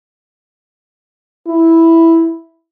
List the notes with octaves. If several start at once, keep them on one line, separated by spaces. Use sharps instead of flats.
E4